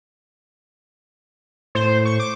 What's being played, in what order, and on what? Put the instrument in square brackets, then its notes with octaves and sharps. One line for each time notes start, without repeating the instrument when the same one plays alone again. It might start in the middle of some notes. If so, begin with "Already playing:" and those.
[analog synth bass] A2 [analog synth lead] C5
[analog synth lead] C#6
D6